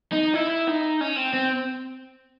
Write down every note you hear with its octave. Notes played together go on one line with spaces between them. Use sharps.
D#4
E4
D#4
C#4
C4
C4